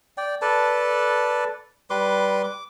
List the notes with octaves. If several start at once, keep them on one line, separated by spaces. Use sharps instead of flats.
D5 G5
A4 B4 D5 A5
G3 B4 C6 D6
D6